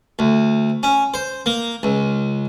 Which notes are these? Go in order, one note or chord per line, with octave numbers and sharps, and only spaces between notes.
D2
C#4
C5
A#3
C#2